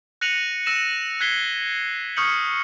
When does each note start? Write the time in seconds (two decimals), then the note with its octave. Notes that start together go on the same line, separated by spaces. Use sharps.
0.21 F#6 A#6 C#7 D#7 F7 F#7
0.66 E6 A#6 D#7 E7
1.20 F#6 G#6 B6 C7 G7
2.17 C#6 D#6 F6 G6 C#7 F#7